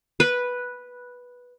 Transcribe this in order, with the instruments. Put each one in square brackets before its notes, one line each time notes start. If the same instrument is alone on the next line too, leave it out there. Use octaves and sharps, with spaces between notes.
[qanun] B4